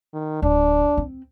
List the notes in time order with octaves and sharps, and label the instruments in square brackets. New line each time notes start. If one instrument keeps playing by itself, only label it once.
[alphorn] D#3
[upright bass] D1 [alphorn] D4
[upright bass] C4